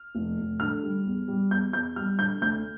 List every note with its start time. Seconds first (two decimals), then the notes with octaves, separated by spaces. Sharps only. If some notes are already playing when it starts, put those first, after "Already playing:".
Already playing: F6
0.15 F1
0.38 F1
0.60 D3 F6
0.83 G3
1.05 E2
1.28 G3
1.51 E2 G6
1.73 E2 G6
1.96 G3 F6
2.19 D3 G6
2.41 D2 G6